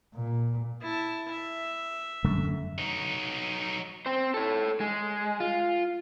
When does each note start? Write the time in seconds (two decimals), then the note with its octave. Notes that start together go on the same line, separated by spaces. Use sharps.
0.15 A#2
0.82 E4 A5
1.31 E5
2.24 F#2 D3 A3
2.78 F#3 D#4
4.06 C4 C5
4.34 A4 C#5
4.80 G#3
5.40 F4